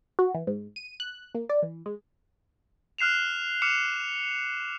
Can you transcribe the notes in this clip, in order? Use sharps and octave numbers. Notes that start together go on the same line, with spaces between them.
F#4
E3
G#2
D#7
F#6
A#3
D5
E3
G#3
F6 F#6 C7 E7 F7
D6 F6 C#7 E7 F7